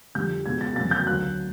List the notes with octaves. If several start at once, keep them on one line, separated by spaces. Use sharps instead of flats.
F2 D3 G3 G6
C#2 B2 G#3 G#6
A6
F1 E2 C#3 F#3 A6
G6
D2 D3 F#3 F#6